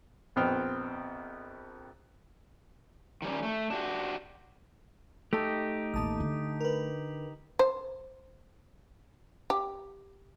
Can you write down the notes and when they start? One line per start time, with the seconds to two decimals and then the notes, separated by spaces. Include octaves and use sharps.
0.36 A#1 F2 B3 C5 G5 F6
3.22 D#3 G3 C#4
3.43 A3
3.70 D4 F#4 G4
5.33 A3 D#4 G4 A4
5.94 A1 D#2 A5 D#6
6.20 D3
6.61 A#4 B4
7.59 C5
9.50 G4